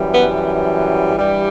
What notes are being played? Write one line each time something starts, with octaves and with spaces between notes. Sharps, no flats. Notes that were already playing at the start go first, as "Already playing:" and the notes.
Already playing: F#2 E3 G3
B3
G2 E3 G3